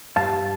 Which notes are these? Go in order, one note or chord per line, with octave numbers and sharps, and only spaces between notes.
G2 F5 A5